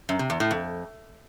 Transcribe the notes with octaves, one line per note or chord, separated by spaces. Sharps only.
F#2
C3
E2
A2
F2